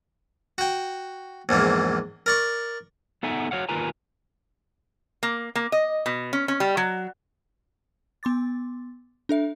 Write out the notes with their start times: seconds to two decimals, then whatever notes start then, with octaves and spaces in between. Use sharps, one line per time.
0.58 F#4 G5
1.49 A#1 E2 G#2 A#3
2.26 A#4 D5 C#6
3.23 B3 D#4 A4 E5 F#5 G#5
3.51 F#4 C#5 F5 F#5
3.69 D#2 F4 A#4 B4 G#5 A#5
5.23 A#3
5.55 A#3
5.72 D#5
6.06 B2
6.33 C#4
6.48 C#4
6.60 G3
6.77 F#3
8.23 B3 C6 D6 A6
9.29 D4 A4 E5